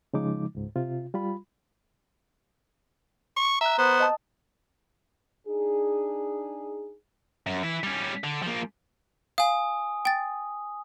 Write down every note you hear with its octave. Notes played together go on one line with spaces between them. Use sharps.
C#3 F3 G#3 D#4 D6
C#2 G#2
C3 F4
G3 F4 B5
C#6
E5 A#5 F#6
B3 C5
D#5 A5 D#6
D4 D#4 G#4
F#2
E3 E4
G3 C#4
D3
F3 A#3
F5 G#5 D#6
G5 A6